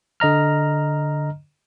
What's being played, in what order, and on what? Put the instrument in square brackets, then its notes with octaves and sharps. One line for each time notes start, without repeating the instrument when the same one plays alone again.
[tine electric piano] D3 D#5 A#5 F6